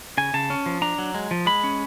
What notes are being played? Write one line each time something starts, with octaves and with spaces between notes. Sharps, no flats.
C#3 G#5
C#3 A5
C#4
F3
D4 A#5
F#3
G#3
F3
G#3 B5
C#4